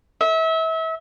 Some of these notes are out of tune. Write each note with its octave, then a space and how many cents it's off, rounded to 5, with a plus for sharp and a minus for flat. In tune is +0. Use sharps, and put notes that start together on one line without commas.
E5 -30